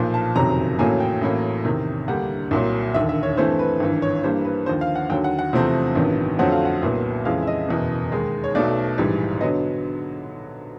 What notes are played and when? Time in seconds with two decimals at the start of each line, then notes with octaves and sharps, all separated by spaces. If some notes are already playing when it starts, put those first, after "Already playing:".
Already playing: B1 A#2 F3
0.14 A5
0.35 F#1 F2 C3 D#3 F#3 A#5
0.79 A1 A2 F#3 A#3 G#5
1.00 G5
1.21 A1 A2 F#3 A#3
1.65 E2 C3 D#3
2.08 D2 D3 G3 A#3 F#5
2.51 C2 A#2 F#3
2.94 E1 D#2 D3 E5
3.09 E5
3.23 C#5
3.37 G2 E3 A3 C4 C5
3.59 B4
3.80 G#1 G2 E3
4.02 C#5
4.23 G2 E3 G3 A#3 C5
4.45 B4
4.66 D#2 D3 F3 C5
4.81 F5
4.96 F#5
5.10 D#2 D3 F#3 G5
5.24 F#5
5.39 F#5
5.53 E2 C3 F3 A3 C4
5.96 A1 G2 D#3 F#3 B3
6.39 F2 D3 F#3 A3 C4 F#5
6.52 F5
6.65 F#5
6.82 C2 A#2 F#3 B3
7.25 F2 C#3 E3 G#3 F5
7.42 E5
7.47 D#5
7.69 F#1 E2 B2
8.12 D#2 D#3 G#3
8.44 C#5
8.55 B1 B2 F#3 A3 D5
8.98 A#1 G#2 E3 G3
9.41 D3 F#3 B3 D#5